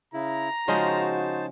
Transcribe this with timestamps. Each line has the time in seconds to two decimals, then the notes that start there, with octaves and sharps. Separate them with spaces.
0.14 C#3 E4 A#5
0.68 C#3 F3 G#3 D#4 F#4 C5 A5